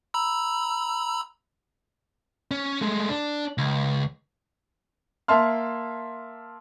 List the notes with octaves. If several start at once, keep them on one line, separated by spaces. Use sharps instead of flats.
A#5 B5 E6
C#4
G#3 A3
D4
C#2
A#3 E5 A5 C6 F6